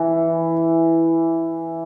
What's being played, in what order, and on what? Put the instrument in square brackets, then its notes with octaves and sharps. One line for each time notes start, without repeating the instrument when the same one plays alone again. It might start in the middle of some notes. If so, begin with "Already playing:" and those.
Already playing: [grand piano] E3